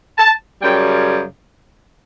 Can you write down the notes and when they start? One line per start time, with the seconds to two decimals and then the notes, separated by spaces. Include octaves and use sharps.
0.18 A5
0.62 F#2 C#3 G3 G5